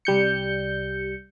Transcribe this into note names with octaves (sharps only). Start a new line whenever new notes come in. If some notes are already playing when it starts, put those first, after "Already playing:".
C2 G3 G6 C#7